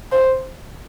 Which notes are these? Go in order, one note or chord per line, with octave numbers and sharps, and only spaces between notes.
C5